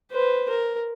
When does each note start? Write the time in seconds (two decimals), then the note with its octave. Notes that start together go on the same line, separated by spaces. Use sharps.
0.11 B4 C5
0.49 A#4